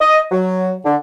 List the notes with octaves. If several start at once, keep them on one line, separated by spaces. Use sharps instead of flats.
D#5
F#3
D3